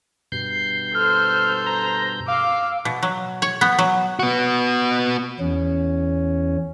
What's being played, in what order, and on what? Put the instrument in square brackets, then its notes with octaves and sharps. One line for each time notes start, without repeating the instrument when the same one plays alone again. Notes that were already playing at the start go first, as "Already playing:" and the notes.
[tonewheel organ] G2 B2 G6 [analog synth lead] C7
[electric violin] A4 C5 [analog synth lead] F6
[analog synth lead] A#5
[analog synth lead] F5 [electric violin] D6 E6
[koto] B2
F#3
C#5
B3
F#3
[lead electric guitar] B3 F#4
[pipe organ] E2 C#4